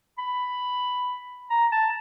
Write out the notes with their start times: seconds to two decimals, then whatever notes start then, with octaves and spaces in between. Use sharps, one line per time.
0.18 B5
1.50 A#5
1.72 A5